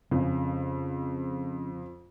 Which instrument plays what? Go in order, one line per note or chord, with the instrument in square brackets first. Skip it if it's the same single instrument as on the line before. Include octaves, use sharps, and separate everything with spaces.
[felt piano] F2 [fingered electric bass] C#3